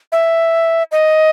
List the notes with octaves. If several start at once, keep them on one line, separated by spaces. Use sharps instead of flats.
E5
D#5